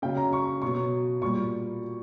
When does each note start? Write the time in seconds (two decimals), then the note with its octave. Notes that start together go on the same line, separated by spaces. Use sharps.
0.02 C#3 F#3 G5
0.17 A#5
0.33 C#6
0.62 B2 F#3 C#6
1.21 A#2 G3 C#6